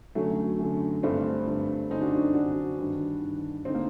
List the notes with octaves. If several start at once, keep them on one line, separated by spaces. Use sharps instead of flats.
F#2 D3 F#3 A3
F#2 D3
G2 D3 A3 C4
G2 D3
F#2 D3 C4 D#4
D4 F#4
D4 F#4
F#2 D3 D4 F#4
G2 D#3
G2 D#3
D3 C4 D#4
A#3